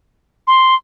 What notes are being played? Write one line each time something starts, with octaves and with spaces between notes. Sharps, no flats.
C6